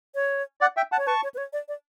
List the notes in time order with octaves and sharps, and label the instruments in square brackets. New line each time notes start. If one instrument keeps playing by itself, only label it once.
[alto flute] C#5
[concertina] D5 F#5
E5 G5
F#5 A5
[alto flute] C#5
[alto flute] B4 [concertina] A5 C#6
[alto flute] C#5
B4
C#5
D5
D5